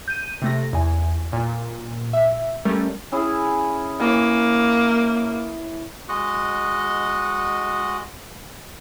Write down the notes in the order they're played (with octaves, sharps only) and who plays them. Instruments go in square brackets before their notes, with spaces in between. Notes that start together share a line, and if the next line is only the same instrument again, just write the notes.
[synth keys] G6 D#7
C3 A3 A#6
E2 G#5
A#2
E5
G3 A3 C#4 A#4
[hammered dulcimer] C#4 E4 G#4
[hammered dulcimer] E3 C#5 [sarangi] A#3
[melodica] G#3 F#4 D#5 F#5